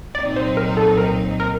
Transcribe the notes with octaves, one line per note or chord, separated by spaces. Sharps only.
C2 A#2 F#3 C4 D#4 D5
C5
A#4
A4
A#4
A#4